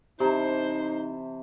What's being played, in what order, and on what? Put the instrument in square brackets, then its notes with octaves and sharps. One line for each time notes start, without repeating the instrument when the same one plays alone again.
[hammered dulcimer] C3 E3 A5 [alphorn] D#4 [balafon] G4 A#5 [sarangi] C5